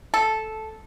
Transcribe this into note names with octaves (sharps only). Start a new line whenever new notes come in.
A4